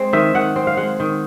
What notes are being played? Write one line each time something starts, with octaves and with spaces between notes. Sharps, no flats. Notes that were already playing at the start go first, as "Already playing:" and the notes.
Already playing: G#3 C4
D#3 E5
D#3 F#5
C4
F5
G#3 F#5
D#3